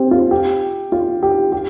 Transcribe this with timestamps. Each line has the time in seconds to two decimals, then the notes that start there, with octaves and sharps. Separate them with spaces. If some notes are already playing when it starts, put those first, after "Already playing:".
Already playing: C4 G4
0.11 F4
0.31 G4
0.92 F4
1.23 G4
1.52 G4